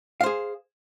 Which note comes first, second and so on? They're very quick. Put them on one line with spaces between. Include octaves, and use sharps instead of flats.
F5 C5 G#4